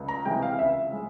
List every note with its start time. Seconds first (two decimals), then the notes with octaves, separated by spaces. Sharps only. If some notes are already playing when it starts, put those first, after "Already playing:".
Already playing: C#2
0.08 A#5
0.25 C3 E3 G#3 G5
0.42 F5
0.59 C#2 E5
0.93 G#3